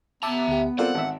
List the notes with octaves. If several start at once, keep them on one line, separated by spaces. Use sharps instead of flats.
B3 E5 A5 A#5 D6 E6
D2 G4
C4 F4 A4 A#4 D5 F5 F#5
G#1 E5